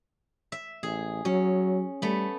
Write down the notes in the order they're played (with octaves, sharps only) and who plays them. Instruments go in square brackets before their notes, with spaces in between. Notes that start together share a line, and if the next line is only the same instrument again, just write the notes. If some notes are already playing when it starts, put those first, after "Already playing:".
[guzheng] E5
[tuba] A1 [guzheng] G#4
[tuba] F#3 [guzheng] C#4
[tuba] G3 [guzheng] A3 B3